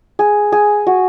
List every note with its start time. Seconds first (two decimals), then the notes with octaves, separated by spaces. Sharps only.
0.19 G#4
0.52 G#4
0.87 F#4